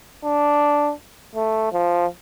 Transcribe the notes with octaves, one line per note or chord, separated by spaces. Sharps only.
D4
A3
F3